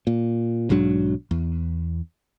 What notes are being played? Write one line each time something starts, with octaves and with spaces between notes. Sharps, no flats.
A#2
B1 G#2 F#3 D4
E2